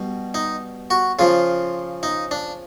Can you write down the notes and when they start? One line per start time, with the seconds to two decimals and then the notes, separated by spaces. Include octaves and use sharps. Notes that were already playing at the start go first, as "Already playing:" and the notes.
Already playing: B2 G3
0.34 D#4
0.90 F#4
1.19 C#3 F3 F4
2.03 D#4
2.31 D4